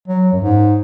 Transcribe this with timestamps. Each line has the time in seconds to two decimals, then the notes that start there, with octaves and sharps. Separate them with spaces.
0.08 F#3
0.33 F#2
0.43 G#2